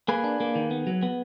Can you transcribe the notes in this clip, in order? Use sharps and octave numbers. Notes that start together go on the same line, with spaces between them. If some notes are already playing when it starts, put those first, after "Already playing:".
A#3 G#4 B4
D4
A#3
D#3
B3
F#3
B3